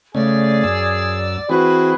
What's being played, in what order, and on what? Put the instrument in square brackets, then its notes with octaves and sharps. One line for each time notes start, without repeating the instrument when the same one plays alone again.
[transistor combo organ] C#3 A3 C#4 [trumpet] G#4 [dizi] D5
[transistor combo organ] F#2 E6
[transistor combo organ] E3 C4 G#4 [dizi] F#4 [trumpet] B4